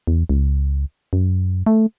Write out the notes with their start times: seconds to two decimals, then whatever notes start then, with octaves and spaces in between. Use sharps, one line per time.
0.07 E2
0.29 C#2
1.13 F#2
1.66 A3